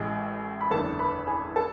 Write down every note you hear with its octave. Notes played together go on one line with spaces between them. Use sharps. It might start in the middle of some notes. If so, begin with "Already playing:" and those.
Already playing: A1 A2 G#3 G#4
B5
F#1 E2 D3 A4 A5
B4 B5
G#4 G#5
A4 A5